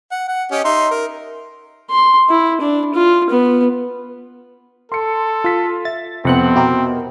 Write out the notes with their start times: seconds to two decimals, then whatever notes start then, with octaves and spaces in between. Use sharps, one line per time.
0.11 F#5
0.28 F#5
0.51 C#4 G4 D#5
0.64 D#4 E5 C6
0.90 A#4
1.90 C6
2.29 E4
2.61 D4
2.94 F4
3.30 B3
4.92 A4 C6 C#7
5.44 F4 B6
5.85 E5 A6
6.25 F2 C3 B3 C4 F#5 F#6
6.56 B2 E4 G4 A#4